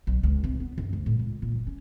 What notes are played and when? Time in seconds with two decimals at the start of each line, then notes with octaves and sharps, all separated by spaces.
0.07 B1
0.23 C#2
0.44 C3
0.60 B3
0.78 F#2
0.93 D2
1.06 A2
1.19 C#2
1.42 A#2
1.55 F#1
1.67 C#4